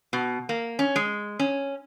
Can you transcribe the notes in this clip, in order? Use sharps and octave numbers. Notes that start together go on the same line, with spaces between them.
B2
A#3
C#4
G#3
C#4